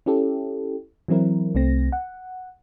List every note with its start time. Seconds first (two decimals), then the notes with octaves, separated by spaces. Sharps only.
0.06 C#4 E4 G4 A4
1.08 E3 F#3 C4 E4 A#4
1.55 C2 A3 C4 A#6
1.92 F#5